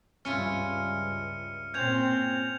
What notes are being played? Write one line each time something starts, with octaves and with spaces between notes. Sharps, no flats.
C#2 G2 C#4 E4 F4 F6 C#7 D#7
A#2 C4 C#4 G6 G#6 F7